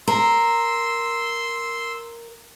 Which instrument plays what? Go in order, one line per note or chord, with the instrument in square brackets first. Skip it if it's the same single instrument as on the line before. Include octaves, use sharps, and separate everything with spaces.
[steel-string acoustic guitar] A#4 [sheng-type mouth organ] C6 E6